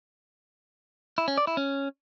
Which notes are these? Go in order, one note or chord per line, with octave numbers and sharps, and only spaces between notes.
E4
C#4
D5
E4
C#4